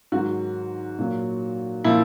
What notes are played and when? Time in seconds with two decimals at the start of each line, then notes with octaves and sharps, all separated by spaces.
0.12 G#2 D#3 F#3 F#4
0.99 A#2 F#3
1.84 A#2 F3 E4